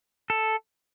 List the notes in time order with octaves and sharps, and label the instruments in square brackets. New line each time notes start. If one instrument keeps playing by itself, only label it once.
[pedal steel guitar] A4